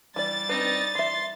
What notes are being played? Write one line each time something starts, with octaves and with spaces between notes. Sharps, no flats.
E3 G3 D5 A6
C4 D4 D#4 B4
E3 E5 C6